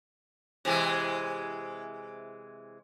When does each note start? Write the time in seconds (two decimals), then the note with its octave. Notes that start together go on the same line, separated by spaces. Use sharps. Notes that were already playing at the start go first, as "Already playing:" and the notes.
0.65 C3 E3 G#3